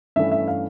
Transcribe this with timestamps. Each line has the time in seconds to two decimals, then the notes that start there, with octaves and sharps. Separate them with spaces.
0.16 G2 E3 A3 C#4 E5
0.32 E5
0.48 F5